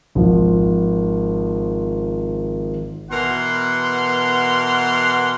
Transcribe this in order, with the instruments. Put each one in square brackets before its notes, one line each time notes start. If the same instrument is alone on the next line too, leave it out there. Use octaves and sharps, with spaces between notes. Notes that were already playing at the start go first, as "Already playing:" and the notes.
[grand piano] G#1 F3
[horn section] B2 E3 A#4 F#5 C6